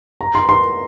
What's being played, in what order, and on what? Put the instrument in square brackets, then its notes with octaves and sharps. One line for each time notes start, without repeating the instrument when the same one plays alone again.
[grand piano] A#5
C6
C6